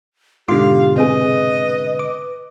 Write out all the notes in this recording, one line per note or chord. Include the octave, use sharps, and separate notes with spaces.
G#2 B2 D3 F4 G4 F5 C6 D6
C3 C4 G#4 B4 D#5
D6